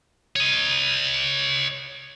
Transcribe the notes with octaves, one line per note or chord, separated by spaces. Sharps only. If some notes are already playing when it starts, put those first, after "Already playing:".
C#5 D#5